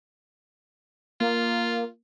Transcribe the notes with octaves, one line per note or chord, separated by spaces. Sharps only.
A#3 F4